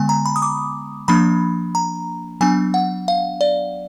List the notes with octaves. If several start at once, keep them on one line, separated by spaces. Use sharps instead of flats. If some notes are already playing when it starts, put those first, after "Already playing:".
Already playing: D3 G#3 B3 G#5
A#5
B5
D#6
D6
F3 A#3 D4 B5
A#5
F#3 B3 D4 G#5
F#5
F5
D5